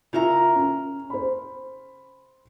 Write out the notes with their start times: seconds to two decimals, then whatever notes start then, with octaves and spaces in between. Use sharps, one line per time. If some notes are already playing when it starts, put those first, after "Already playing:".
0.13 C#3 E4 F4 A#4 E5 A#5
0.55 C#4
1.10 C5 B5